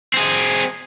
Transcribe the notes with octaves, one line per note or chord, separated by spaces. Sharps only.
C4 G#4